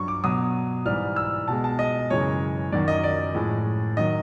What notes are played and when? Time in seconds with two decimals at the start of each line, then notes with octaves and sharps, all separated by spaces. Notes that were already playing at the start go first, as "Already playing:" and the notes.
Already playing: G2 F#3 C#6
0.08 D6
0.24 B2 F#3 D#6
0.86 G#2 E3 G3 F6
1.16 E6
1.48 B2 G#3 A5
1.64 A5
1.79 D#5
2.10 F#2 C#3 E3 G#3 C#5
2.72 F#2 D#3 F#3 D5
2.88 D#5
3.03 D5
3.34 A2 F3 G#3
3.97 D#3 F#3 D#5